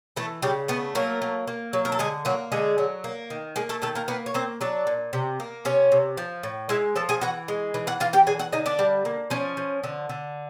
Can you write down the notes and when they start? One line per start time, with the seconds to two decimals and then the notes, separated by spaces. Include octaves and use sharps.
0.16 E3 A3 A4
0.42 C#3 G3 G4
0.68 A3 B3 B4
0.95 F#3 A#3 A#4
1.22 A#3
1.47 A#3
1.73 F#3
1.85 A#4
1.92 A4
1.99 D3 G#3 G#4
2.25 F#3 A#3 F#4
2.52 D3 G#3 G#4
2.78 F#3
3.04 A#3
3.30 D#3
3.56 G#3 A#3 G#4
3.69 A3 A4
3.82 D#3 A3 A4
3.95 A#3 A#4
4.08 A#3 B3 B4
4.26 C#5
4.34 A#3 C4 C5
4.61 F#3 D4 D5
4.87 A#2
5.13 C3
5.40 A#3
5.65 C3 C#4 C#5
5.92 C3
6.17 F3
6.43 A2
6.69 G#3 E4 E5
6.96 F3 A4 A5
7.09 G#4 G#5
7.21 E3 F#4 F#5
7.48 G#3
7.74 E3
7.87 F#4 F#5
8.00 E3 F4 F5
8.13 G4 G5
8.27 D3 G#4 G#5
8.39 F#4 F#5
8.52 D3 D#4 D#5
8.66 D4 D5
8.79 G3
9.05 A#3
9.30 F3 C#4 C#5
9.57 F3
9.84 D3
10.09 D3